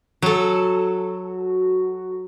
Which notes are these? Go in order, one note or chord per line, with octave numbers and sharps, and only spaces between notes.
F#3 F#4 A4